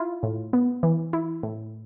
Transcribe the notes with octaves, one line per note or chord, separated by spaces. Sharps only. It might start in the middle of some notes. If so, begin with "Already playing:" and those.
Already playing: E4 F4
A2
B3
E3
E4
A2